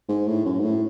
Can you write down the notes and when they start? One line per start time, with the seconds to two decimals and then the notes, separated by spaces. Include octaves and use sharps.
0.09 G#2
0.28 A2
0.45 F#2
0.59 G#2
0.64 A2